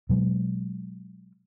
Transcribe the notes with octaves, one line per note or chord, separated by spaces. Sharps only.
B2 F#3 G#3